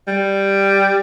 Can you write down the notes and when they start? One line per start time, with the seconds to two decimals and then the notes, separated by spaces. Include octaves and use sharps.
0.08 G3